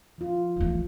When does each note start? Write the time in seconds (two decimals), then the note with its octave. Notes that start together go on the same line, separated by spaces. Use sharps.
0.18 F3 F4
0.56 E3 A3